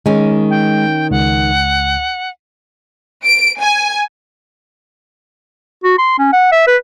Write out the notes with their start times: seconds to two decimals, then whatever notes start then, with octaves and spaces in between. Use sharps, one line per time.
0.06 D#3 G#3 C#4
0.50 G5
1.11 C#2 F#5
3.25 D7
3.61 G#5
5.84 F#4
5.99 C6
6.18 C#4
6.33 F#5
6.52 E5
6.67 B4